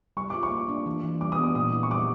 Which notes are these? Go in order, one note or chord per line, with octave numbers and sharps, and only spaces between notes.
G3 C#6
F4 D6
C#6
A#3
D4
E3
E3
G3 D6
D#6
B3
D6
A#2 D#6
E4
C#6
G3 D6